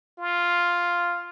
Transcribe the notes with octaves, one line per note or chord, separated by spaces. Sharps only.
F4